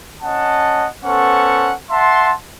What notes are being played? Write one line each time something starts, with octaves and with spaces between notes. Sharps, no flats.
C#4 D#5 F#5 A5
B3 C#4 A4 C5 F#5 C#6
E5 F#5 A5 C6